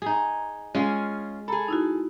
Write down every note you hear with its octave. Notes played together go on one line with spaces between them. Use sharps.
D#4 G#4
G#3 C#4 F4 G#4
G#4 A4 A#5 B5
D#4 E4 F#4